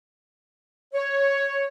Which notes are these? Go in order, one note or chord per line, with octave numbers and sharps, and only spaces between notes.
C#5